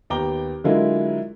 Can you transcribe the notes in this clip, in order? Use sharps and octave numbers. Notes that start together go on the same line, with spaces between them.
D#2 B3 G5 A#5 D6 G7
D3 F#3 G#3 E4 F4 A#4